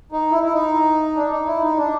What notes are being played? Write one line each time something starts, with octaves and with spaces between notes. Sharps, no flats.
D#4
E4
E4
D#4
D4
D#4
E4
D#4
D4